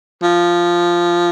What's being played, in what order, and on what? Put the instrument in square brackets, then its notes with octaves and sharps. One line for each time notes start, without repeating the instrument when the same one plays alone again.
[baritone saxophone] F3